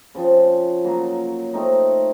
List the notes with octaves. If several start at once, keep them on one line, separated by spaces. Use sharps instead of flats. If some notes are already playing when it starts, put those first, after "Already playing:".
C#3 F3 C4
C#3 F#3 A#3
A3 C4 D#4